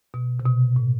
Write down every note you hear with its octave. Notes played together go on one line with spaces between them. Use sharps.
B2
C3
B2
A2